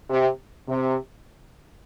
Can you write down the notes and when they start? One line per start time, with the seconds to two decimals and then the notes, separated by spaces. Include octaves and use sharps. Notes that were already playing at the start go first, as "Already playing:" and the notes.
0.10 C3
0.69 C3